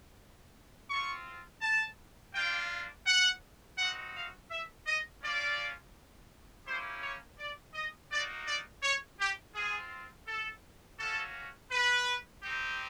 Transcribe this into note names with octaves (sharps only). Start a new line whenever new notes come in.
C4 F4 C#6
A5
A#3 D4 F4 G5
F#5
C4 D#4 F#4 F#5
F5
E5
D#5
A#3 C#4 F4 D5
A#3 C#4 E4 G4 C5
C#5
D5
D#5
A#3 D#4 F#4 D5
D5
C#5
G4
C4 F4 G#4
A4
A#3 C#4 F#4 A4
B4
C4 D#4 G4